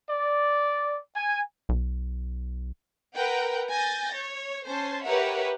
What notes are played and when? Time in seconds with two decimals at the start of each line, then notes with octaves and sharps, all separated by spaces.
0.10 D5
1.16 G#5
1.69 B1
3.16 A#4 B4 F#5 G5
3.70 G#5 G6 A6 A#6
4.15 C#5
4.66 C#4 C5 A5 C6
5.04 G4 A#4 B4 C#5 E5 F#5